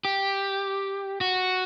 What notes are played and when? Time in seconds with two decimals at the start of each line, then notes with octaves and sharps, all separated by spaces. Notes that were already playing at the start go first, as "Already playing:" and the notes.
0.05 G4
1.21 F#4